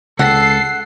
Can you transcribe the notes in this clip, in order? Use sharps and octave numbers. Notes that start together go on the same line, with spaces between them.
C#2 A4 F#5 C7